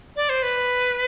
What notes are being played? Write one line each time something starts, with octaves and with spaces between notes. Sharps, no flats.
D5
C5
B4